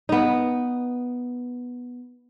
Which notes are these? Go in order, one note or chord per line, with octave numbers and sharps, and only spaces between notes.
B3 D#4